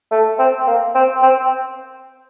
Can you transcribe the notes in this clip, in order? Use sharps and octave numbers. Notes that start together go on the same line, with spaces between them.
A3
C4
A#3
C4
C4